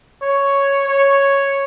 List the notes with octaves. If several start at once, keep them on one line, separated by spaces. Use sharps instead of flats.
C#5
C#5